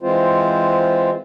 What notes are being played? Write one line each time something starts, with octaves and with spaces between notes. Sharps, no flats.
E3 G#3 C4 F4 C5